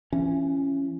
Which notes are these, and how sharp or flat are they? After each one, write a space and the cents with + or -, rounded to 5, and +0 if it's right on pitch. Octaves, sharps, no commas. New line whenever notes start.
E3 +30 C#4 -10